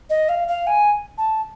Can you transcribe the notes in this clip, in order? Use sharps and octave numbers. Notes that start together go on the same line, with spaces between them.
D#5
F5
F5
G#5
A5